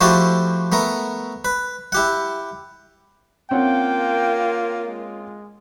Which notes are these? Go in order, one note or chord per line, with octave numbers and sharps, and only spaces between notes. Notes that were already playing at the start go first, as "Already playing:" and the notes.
F3 A3 E4 F#4 G4 A4
A3 B3 A#4
B4
E4 G4 F#5
A#3 C4 C#4 F4 F#5 G5
G#3